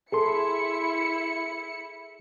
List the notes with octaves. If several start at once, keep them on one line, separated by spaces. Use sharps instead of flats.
E4 G#4 A4 C6 C#7